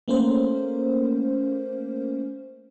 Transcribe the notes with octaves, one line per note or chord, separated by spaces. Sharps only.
A3 A#3 C#4 A#4 C5